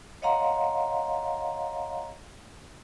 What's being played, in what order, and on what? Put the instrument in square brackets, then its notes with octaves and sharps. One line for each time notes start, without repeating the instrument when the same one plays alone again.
[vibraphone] C#5 D#5 F5 F#5 A#5 C6